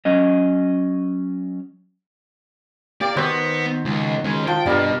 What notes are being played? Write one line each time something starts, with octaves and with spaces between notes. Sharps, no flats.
F#3 C#4 D#5
A#3 G4 D5
D#3 B3 F#4 C5 E6
C#2
G#3 C#4
F3 G5
G2 B2 G3 A#4